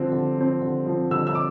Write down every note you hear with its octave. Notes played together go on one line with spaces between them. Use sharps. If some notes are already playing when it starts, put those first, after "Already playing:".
Already playing: D3 F3 C4
D3
F3 C4
D3
F3 C4
D3 E6
E6
D6